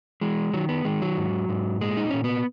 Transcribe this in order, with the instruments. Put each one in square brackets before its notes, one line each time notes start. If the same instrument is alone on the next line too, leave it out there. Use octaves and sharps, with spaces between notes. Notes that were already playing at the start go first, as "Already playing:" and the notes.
[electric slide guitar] E3 G#3
D#3 F#3
B3
D#3 G#3
F#3
G#2
G#2
A#2 G#3
D#4
A#2 C#4
B3